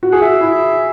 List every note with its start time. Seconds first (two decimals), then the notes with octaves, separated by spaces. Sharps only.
0.03 F#4
0.11 G#4 F#5
0.21 F#4 E5
0.41 E4